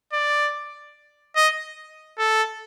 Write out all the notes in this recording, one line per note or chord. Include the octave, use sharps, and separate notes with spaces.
D5
D#5
A4